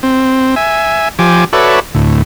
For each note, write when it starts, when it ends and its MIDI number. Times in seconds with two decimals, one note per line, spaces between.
0.03 0.55 60
0.56 1.08 76
0.56 1.08 80
1.19 1.44 53
1.19 1.44 67
1.19 1.44 80
1.19 1.44 86
1.53 1.80 66
1.53 1.80 69
1.53 1.80 71
1.53 1.80 73
1.53 1.80 74
1.53 1.80 76
1.95 2.22 38
1.95 2.22 45